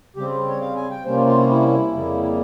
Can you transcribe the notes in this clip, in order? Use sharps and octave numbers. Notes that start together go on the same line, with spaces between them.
C#3 G3 C4 G4
C#5
F5
G#5
G5
C3 G3 A#3 C#4 C5
F4
F4
E4
E4
F2 C#3 G3 A#3